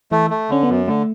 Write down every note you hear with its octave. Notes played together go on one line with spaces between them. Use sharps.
E3 A3
A3
D3 C#4
B3
F#2
D3 A3